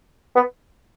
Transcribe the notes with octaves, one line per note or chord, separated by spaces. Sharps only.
B3